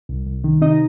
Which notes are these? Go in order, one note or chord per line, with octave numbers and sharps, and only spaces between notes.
C2
C2
D#3
C3 D#4 D#5